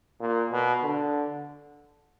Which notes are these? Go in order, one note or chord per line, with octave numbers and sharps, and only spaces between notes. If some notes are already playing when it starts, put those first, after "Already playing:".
A#2
B2
D3